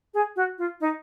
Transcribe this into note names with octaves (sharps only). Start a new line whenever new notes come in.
G#4
F#4
F4
D#4